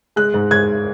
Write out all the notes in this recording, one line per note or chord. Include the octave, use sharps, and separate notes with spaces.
G#3 F#6
G#2
G#2 G#6